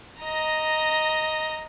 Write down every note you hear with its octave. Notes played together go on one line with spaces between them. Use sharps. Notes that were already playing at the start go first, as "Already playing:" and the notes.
D#5 A#5